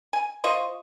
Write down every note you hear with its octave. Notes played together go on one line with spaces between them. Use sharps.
G#5
F4 C5 D#5 C#6